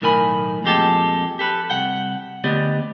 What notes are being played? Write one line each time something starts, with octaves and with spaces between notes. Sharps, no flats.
B1 A2 D#3 A#4 G#5 B5
F2 A#2 G#3 G4 A4 A5
G4 A4 B4
C2 F#5 G5
D2 B3 G4 D5 D#5